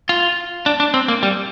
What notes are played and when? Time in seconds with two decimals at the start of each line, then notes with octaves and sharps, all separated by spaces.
0.09 F4
0.66 D4
0.80 D4
0.94 C4
1.08 A#3
1.23 G3